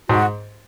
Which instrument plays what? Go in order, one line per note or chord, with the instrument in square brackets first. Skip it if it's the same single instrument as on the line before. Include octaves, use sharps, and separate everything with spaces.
[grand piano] G#2 [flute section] F#4